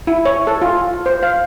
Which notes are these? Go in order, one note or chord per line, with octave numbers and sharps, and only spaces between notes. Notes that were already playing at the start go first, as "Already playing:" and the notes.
E4
C#5
A4
F4
C5
F5